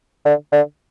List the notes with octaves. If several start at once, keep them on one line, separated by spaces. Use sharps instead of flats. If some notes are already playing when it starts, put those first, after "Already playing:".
D3
D3